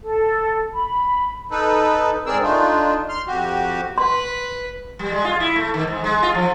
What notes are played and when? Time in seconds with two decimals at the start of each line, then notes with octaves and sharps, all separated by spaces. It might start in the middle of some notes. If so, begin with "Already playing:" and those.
0.04 A4
0.73 B5
1.51 D#4 A4 B4
2.26 G#2 C4 G#4 A#4 D5 E6
2.42 A3 D4 D#4 F4
3.09 C6 F6
3.27 F2 F#4 G4
3.98 B4 C6
4.99 G3
5.12 G#3
5.24 F4
5.40 E4
5.56 A3
5.74 D#3
5.87 G#2
6.04 G#3
6.23 F4
6.35 F3